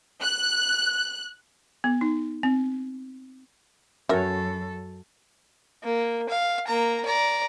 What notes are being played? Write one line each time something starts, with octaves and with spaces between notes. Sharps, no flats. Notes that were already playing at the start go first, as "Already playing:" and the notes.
F#6
B3
D#4
C4
F#2 C#4 F#4 A4 A#4 C#5 E5
A#3
F5
A#3 A#5
D5 A#5